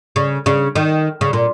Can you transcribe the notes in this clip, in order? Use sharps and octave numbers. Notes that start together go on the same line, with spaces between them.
C#3
C#3
D#3
C#3
A#2